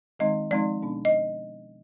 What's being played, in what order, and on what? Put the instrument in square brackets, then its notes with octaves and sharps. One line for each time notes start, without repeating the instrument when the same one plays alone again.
[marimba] D#3 G#3 C4 D#4 D#5
F3 G#3 C4 D#4 D5
B2 B3 D4
D#5